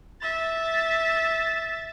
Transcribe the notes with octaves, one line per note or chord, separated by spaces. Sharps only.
E5 A6